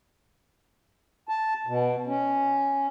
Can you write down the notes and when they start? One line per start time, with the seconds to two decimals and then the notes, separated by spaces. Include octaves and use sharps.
1.29 A5
1.67 B2
2.07 C#4